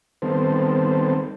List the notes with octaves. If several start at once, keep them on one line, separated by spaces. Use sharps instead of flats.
D#3 G3 B3 C4 A4 C5